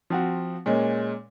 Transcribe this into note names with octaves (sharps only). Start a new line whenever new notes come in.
F3 C4 F#4
A#2 G#3 C#4